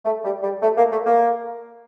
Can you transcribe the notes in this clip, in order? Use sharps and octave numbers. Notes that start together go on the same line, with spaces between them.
A3
G3
G3
A3
A#3
A3
A#3